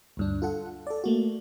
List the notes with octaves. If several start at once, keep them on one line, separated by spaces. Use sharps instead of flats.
D2 G2 D4
F4 A4 F#5
A4 D5
A3 A#3 F#4